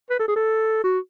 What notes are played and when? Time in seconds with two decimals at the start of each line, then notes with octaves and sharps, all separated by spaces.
0.10 B4
0.19 A4
0.28 G#4
0.36 A4
0.84 F#4